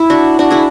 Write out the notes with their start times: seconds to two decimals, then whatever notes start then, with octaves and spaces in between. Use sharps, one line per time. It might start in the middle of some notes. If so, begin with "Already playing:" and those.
Already playing: E4
0.10 D4 F#4
0.39 D4 F#4
0.50 E4 G#4